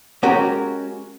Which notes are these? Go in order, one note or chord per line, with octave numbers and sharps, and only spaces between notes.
G#3 C#4 F#4 G4 A#4